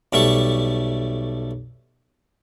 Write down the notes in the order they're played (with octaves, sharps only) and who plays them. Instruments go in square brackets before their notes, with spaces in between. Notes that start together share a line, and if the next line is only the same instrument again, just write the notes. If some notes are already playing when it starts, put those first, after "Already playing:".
[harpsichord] B1 G3 A3 C#6